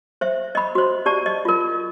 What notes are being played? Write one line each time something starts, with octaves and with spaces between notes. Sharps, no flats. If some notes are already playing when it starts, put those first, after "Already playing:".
C5 E5
D#5 B5
F#4 C5
G4 D5 A5
D#5
F4 A#4